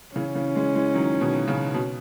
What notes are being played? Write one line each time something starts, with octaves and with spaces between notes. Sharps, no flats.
C#3 E3 C#4
C#3 E3
E3 G#3
E3 G#3
D#3 F#3
B2 D#3
C#3
B2